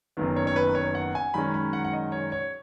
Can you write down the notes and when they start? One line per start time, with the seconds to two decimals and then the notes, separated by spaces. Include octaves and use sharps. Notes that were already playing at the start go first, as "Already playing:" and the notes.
0.17 F#1 F#2 D#3 B3
0.36 C#5
0.47 C#5
0.56 B4
0.75 C#5
0.95 F#5
1.15 G#5
1.34 F#2 D#3 G#3 C#4 B5
1.54 B5
1.73 F#5
1.85 F#5
1.93 D#5
2.12 C#5
2.32 C#5